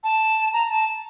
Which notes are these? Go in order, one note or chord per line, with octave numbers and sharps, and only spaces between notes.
A5
A#5
A5